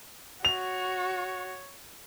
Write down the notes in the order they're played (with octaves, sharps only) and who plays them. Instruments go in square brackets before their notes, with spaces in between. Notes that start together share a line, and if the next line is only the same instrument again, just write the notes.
[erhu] F#4 [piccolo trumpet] C#5 [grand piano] F7